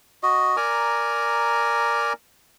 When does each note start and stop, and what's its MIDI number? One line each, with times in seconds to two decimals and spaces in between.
0.23 0.56 66
0.23 0.56 75
0.57 2.13 70
0.57 2.13 74
0.57 2.13 80
0.57 2.13 82